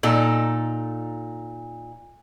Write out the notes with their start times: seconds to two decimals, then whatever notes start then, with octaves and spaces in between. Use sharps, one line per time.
0.03 A#2 D#4 A4